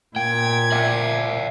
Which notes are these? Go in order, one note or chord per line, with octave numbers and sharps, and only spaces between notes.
A#2 G5 G#6
D5 E5 G5